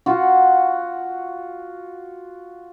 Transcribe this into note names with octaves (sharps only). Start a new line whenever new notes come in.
F4 F#4